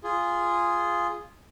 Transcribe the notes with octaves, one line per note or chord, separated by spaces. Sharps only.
F4 G#4